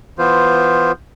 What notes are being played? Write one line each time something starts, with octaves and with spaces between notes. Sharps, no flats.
E3 B3 F4 C5